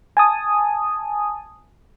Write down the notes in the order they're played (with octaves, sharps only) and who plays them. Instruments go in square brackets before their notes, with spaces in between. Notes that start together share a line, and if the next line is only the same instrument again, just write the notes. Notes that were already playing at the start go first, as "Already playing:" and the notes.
[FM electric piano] G#5 A5 D#6